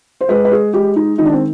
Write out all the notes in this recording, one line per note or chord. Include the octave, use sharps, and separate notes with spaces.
C5
G#3 B4
B4
G#4
G#3 G4
D#4
D#3 D#4
D4
C4